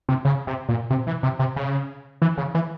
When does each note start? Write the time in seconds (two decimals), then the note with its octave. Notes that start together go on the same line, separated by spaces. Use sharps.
0.09 C3
0.25 C#3
0.47 C3
0.69 A#2
0.90 C3
1.07 E3
1.23 C3
1.39 C3
1.56 C#3
2.22 E3
2.38 C#3
2.55 E3